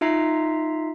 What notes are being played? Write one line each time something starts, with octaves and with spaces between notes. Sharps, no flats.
D#4 F4 E5 A#5 C7